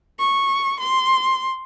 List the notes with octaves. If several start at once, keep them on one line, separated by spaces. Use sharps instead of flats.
C#6
C6